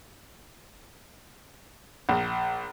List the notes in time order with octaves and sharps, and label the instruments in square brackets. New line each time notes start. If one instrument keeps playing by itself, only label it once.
[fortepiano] A#1